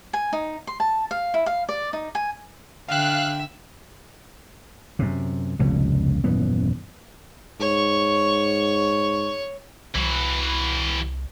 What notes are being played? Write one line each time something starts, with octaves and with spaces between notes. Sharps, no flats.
G#5
D#4
C6
A5
F5
E4
F5
D5
D#4
G#5
D3 E5 F5 G5 F#6
F#2 C3
F1 C#2 G2 B2
D#1 F#2 E3 B3
G#2 C#5 C#6
C2 E3 F#4